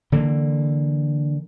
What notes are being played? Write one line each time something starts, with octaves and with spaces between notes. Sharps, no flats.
D3 E3 A#3